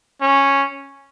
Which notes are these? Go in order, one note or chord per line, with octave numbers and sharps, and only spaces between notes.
C#4